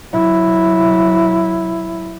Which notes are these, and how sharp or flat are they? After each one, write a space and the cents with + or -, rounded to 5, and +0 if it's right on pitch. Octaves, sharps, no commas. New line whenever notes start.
F#3 +0 E4 +0